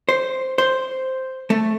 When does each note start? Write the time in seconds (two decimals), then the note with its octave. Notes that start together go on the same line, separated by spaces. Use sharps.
0.09 C5
0.58 C5
1.50 A3